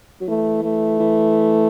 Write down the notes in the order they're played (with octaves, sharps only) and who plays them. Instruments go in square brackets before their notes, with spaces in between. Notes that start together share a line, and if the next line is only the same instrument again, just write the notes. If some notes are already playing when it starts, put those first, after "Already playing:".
[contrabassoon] F#3
[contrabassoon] E3 [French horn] A3
[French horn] A3
[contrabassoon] E3